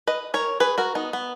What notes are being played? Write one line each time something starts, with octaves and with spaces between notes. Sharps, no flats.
B4 D#5
A#4 C#5
G#4 B4
F#4 A#4
B3 D#4
B3